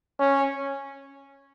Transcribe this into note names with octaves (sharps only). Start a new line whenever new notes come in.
C#4